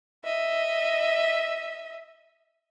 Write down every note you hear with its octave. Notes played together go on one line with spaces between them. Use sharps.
D#5 E5